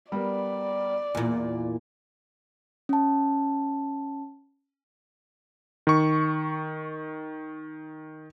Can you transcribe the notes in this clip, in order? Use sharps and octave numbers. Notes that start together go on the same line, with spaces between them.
G3 B3 A#4 D5
E2 A#2 G#5
C#4 A5
D#3 C#6